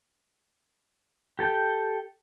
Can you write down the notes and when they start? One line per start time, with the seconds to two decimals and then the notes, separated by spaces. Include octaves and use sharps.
1.39 G4 A4 G5